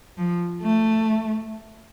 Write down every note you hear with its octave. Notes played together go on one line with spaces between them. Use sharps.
F3
A3